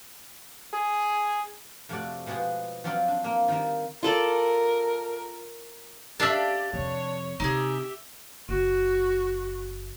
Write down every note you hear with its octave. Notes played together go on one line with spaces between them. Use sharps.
G#4
F2 C3 A3 F#4 D5
B2 F3 G#3 B3 G4 G#4
F3 F#3 C4 F4 D5 F5
D4
A#3 C6
D#3 G3 A#3
F4 A4 A#4 D5
D4 G4 D5 E5 F5 A5
F2 C3 C#5
C3 D#4 G4 G#4 E5
F#1 F#4